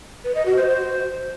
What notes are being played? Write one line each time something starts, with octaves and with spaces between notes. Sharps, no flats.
B4
D#5
F#4
C5
C5